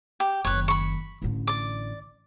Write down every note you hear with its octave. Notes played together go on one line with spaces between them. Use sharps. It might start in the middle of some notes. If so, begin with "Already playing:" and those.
G4
F#1 D#3 B4 C#5
B5 C#6
A1 D3
D5 D6